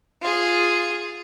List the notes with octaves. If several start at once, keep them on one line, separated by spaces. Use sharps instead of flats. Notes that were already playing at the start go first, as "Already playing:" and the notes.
F4 G#4